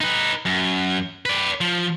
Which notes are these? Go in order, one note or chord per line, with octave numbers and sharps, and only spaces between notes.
D#4 B4
F#2
B4 D5
F3